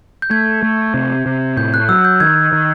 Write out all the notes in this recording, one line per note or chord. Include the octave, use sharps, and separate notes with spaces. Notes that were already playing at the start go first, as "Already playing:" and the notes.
G6
A3 G#6
A3
C3
C3
A2 G6
F#6
F#3 E6
G6
D#3 G#6
D#3